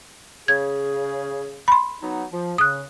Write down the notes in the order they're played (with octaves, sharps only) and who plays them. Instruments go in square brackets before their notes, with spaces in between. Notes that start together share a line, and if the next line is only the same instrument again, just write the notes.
[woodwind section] C#3 G#4 [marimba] G#6
[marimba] B5 C6
[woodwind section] F#3 B3 D#4
F3
[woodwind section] C#3 [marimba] D#6 F#6